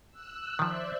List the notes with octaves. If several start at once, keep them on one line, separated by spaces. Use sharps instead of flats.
E6 F#6
D#3 F3 C5 D5 E5